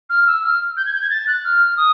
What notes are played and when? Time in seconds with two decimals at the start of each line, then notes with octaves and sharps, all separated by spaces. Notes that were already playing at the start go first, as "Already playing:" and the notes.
0.10 F6
0.27 E6
0.44 F6
0.77 G6
0.86 G#6
0.93 G6
1.02 G#6
1.10 A6
1.27 F#6
1.44 F6
1.77 D#6